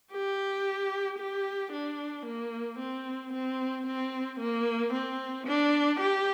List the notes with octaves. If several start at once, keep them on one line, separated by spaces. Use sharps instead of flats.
G4
G4
D4
A#3
C4
C4
C4
A#3
C4
D4
G4